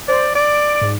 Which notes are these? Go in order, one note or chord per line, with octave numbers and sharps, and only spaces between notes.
C5 D5
D5 D7
G#2